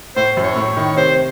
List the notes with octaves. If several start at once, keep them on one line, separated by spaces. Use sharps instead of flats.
A2 C5
F#2
C#5
A2
D#3
C3 C5